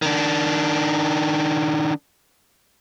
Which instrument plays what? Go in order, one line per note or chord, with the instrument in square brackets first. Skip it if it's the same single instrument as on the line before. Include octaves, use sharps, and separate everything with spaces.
[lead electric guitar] D#3 D4